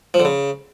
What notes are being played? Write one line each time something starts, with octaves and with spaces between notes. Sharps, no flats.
F3
D3
C#3